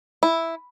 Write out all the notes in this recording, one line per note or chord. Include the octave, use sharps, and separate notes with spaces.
E4